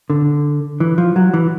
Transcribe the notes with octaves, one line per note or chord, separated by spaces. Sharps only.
D3
E3
F3
F#3
E3